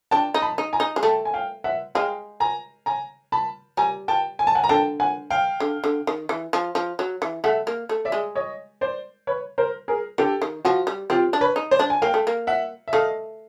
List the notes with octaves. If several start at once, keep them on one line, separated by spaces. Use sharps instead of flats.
D4 G5 A5
D#4
A5 B5
D#4
G#5 A#5
D#4
G#3
A3 G5 A5
G#5
F5 G5
E5 F#5
G#3 F5 G5
G#5 A#5
G#5 A#5
A5 B5
G3 G#5 A#5
G5 A5
G#5
A5
F#5 G#5
A#5
D3 G5 A5
F#5 G#5
F5 G5
D3
D3
D#3
E3
F3
F3
F#3
E3
A3 E5 F#5
A#3
A3
D5 E5
G#3
C#5 D#5
C5 D5
B4 C#5
A#4 C5
G#4 A#4
D3 G4 A4
D#3
F3 F#4
G3
C4 F4 G4
D4
B4 C#5
D#4
C5 D5
D4
G#5
A#3 F5 G5
A3
A#3
E5 F#5
E5
A3 D#5 F5